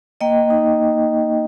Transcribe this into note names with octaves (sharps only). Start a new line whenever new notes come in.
A#3 D#5 G5
D#4